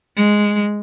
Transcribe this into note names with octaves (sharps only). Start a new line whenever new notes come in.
G#3